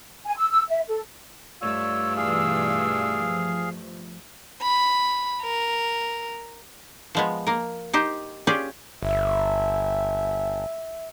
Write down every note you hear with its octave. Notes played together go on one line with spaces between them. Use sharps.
G#5
E6
E6
E5
A4
G2 A3 F4 C#5 D5 E6
B2 E3 G#4 F5
F3
B5
A#4
F3 G#3 B3
A#3 A#4
D#4 G4 C5
C#4 F4 G4 G#4 D5
G1 E5